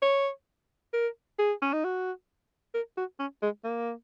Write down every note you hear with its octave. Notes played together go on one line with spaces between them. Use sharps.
C#5
A#4
G#4
C#4
D#4
F#4
A#4
F#4
C#4
G#3
A#3